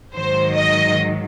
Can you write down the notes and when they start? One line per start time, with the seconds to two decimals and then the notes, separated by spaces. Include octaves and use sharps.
0.15 G#2 D#3 F#3 C5
0.56 D#5